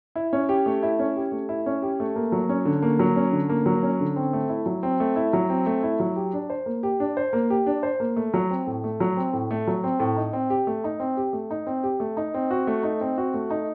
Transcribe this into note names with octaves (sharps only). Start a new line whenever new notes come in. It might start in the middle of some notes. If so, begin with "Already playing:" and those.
E4
C#4
G4
A3
E4
C#4
G4
A3
E4
C#4
G4
A3
A#3
F#3
C#4
D3
A#3
F#3
C#4
D3
A#3
F#3
C#4
D3
C4
A3
E4
F#3
C4
A3
E4
F#3
C4
A3
E4
F#3
G4
D4
C5
A#3
G4
D4
C5
A#3
G4
D4
C5
A#3
A3
F#3
C4
A2
A3
F#3
C4
A2
A3
F#3
C4
A2
D#4
C4
G4
A3
D#4
C4
G4
A3
D#4
C4
G4
A3
D#4
C4
F#4
A3
D#4
C4
F#4
A3
D#4